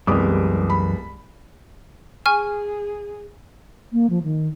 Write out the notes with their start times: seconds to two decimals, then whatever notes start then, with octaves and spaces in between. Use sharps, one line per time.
0.07 C2 F#2 E3 G3 G#3 B3 D6 D#6
0.70 B5
2.26 G#4 G#5 C#6 F6
3.93 A#3
4.10 F3
4.23 D#3